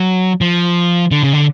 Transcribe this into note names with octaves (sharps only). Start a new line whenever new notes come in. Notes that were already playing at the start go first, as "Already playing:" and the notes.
Already playing: F#3
F3
D3
C#3
D3